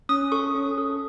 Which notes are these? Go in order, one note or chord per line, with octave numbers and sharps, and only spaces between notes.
C#4 D#6
A4 C#6
C#4
A4